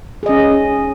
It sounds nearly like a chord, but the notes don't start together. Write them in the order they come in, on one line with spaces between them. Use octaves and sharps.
G#4 D#5 C#4